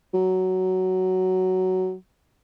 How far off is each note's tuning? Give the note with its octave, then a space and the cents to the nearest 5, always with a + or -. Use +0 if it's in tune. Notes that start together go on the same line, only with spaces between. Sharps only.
F#3 +10